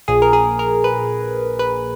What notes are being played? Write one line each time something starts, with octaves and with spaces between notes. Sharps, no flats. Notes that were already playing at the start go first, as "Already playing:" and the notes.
A#1 A#2 G#4
A#4
G#4
A#4
B4
B4